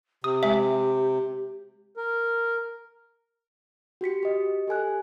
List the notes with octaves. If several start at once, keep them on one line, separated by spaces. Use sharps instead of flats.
C3 G4 D#6
G#3 E5 G#5
A#4
F#4 G4 B6 C#7
G4 D#5
G4 A4 G#5 F#6